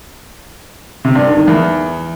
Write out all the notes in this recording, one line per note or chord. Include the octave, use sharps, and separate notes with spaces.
C3
G2
D#3
D#3
E2